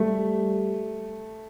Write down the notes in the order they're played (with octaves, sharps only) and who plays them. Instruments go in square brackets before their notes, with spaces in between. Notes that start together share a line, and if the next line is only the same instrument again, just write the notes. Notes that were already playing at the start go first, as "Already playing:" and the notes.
Already playing: [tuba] G3 [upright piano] A3